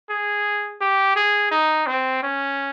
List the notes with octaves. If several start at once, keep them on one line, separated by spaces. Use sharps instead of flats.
G#4
G4
G#4
D#4
C4
C#4